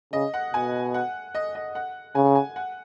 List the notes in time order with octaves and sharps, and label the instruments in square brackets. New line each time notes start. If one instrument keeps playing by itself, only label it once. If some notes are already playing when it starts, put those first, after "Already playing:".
[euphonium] C#3 [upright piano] D#5
[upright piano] F#5
[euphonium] B2 [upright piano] G#5
[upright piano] F#5
D#5
D#5
F#5
[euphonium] C#3 [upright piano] G#5
[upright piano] G#5
F#5